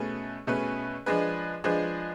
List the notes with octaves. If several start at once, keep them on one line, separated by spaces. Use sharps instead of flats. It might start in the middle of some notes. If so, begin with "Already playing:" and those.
Already playing: B2 A3 C#4 G#4 B4
B2 A3 C#4 G#4 B4
F3 G#3 D4 G#4 B4
F3 G#3 D4 G#4 B4